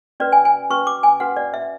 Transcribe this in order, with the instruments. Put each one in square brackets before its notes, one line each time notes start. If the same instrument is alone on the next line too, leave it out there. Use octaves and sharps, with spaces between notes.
[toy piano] C#4 F#4 B4 D5
G#5
G#5
C#4 F#4 B4 C#6
D6
G#5
C#4 F#4 B4 F#5
D5
E5